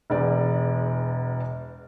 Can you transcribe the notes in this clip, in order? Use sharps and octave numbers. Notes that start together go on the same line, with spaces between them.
E1 E2 D5